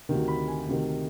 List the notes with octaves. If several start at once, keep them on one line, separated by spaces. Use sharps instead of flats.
D2 C3 D#3
B5
G#5
D2 C3 D#3